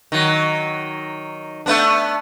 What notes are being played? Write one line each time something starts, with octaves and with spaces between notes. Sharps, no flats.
D#3 F#3
A3 B3 D4